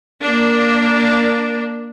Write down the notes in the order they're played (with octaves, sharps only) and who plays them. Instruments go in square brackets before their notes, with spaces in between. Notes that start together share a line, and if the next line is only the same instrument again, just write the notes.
[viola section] A#3 D4